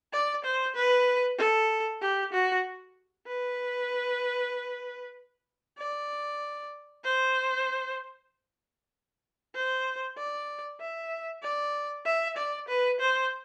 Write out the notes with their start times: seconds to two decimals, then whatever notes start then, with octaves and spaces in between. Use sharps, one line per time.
0.13 D5
0.44 C5
0.76 B4
1.38 A4
2.01 G4
2.33 F#4
3.27 B4
5.78 D5
7.04 C5
9.55 C5
10.17 D5
10.80 E5
11.42 D5
12.05 E5
12.37 D5
12.68 B4
13.00 C5